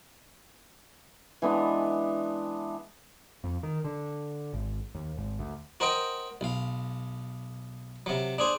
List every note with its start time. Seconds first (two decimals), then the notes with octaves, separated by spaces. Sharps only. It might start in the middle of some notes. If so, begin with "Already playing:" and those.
1.42 E3 G#3 B3 D4
3.44 F2
3.63 D#3
3.84 D3
4.53 G#1
4.95 D#2
5.17 G#1
5.39 D2
5.80 F#4 A#4 C5 D#5 G5
6.41 B1 F5
8.06 C3 F#3
8.38 D4 G#4 C5